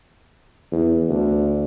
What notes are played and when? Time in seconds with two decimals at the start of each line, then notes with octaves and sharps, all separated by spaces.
0.72 E2
1.09 D2